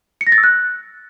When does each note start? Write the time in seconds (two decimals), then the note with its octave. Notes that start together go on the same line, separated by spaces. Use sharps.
0.21 C#7
0.27 A#6
0.32 A6
0.38 E6
0.44 F#6